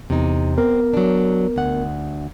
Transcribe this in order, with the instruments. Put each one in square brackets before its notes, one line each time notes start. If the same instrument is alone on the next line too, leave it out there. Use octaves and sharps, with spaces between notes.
[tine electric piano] E2 [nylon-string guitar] C3 D#4
[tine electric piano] B3 A#4 [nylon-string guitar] C4
[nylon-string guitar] F#3 D4
D2 F#5